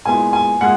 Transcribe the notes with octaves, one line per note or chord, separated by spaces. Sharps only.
A#2 G#3 B3 E4 G#5
G#5
A#2 G#3 F#5